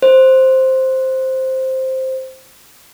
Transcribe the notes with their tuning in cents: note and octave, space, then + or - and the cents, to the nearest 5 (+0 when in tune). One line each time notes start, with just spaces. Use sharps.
C5 +5